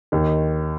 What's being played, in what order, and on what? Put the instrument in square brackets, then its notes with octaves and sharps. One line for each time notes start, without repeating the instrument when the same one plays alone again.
[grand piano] D#2 D#3